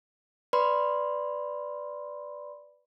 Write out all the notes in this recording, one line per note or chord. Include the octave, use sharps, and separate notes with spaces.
B4 D5 B5 C6